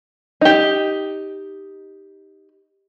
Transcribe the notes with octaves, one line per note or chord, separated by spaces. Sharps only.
D#4 G4